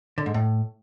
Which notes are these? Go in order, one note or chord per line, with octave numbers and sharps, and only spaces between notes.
D3
G#2
A2